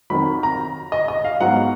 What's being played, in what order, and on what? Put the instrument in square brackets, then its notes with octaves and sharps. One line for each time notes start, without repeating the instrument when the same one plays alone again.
[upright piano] F2 D#3 F#3 B5
A#5
D#5
D#5
F5
G#2 F#3 B3 F#5